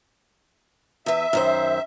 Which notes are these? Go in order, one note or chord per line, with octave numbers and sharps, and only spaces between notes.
E2 B4 E5
F#2 D#3 C5